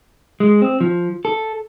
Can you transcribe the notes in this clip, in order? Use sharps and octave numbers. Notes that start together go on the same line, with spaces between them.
G#3
C4
F3
A4